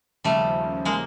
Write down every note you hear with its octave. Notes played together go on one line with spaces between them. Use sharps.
D#2 C#3 F3 G3 A3
G#3 A#3